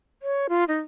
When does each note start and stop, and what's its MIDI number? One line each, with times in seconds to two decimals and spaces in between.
0.22 0.47 73
0.49 0.64 65
0.68 0.79 63